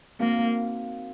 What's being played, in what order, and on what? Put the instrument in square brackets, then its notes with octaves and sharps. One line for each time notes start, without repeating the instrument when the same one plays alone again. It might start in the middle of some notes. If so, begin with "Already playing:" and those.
[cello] A#3 [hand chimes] C4 D#4 F#4 A#4 F5